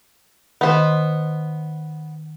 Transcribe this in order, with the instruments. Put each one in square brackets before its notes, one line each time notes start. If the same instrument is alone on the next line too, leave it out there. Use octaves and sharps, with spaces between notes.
[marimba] D#3 B4 D#5 [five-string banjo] B3 C5